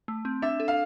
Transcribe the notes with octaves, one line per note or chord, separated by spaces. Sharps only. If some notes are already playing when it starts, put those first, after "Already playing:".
A3
C4
D4 E5
A4
F5